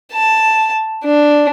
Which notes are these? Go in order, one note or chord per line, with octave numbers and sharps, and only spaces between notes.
A5
D4